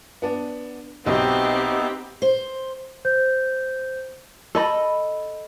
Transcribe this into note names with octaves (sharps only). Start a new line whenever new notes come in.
B3 D4
B1 B3 C4 D#4 F#4 G4 E5
C5
C5 G6
A4 D#5 B5